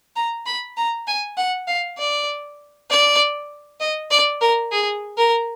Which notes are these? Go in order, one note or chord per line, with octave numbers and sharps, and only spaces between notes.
A#5
B5
A#5
G#5
F#5
F5
D5
D5
D#5
D5
A#4
G#4
A#4